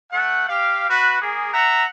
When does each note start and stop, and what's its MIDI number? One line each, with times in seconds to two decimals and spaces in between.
0.12 0.45 57
0.12 0.45 78
0.48 0.86 67
0.48 0.86 77
0.89 1.20 66
0.89 1.20 71
1.21 1.49 58
1.21 1.49 68
1.52 1.84 76
1.52 1.84 78
1.52 1.84 82